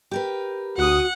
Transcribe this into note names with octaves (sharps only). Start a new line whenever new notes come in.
G4 A#4 B4
D2 F#4 F#5 D#6